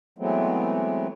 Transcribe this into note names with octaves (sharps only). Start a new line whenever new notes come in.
E3 F#3 G#3 A3 B3 C4